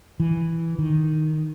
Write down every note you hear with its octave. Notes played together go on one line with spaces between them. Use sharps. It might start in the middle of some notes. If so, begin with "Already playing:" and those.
E3
D#3